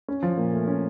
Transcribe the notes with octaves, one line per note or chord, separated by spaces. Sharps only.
C#4
F3
A#2
A3
C#4